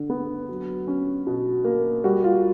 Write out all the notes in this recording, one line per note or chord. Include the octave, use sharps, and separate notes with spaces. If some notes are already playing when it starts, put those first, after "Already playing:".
Already playing: D3
B3
F#3
C#4
B2
A#3
G3 F#4
F4